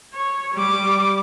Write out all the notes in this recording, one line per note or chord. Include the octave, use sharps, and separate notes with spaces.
C#5
G3 D6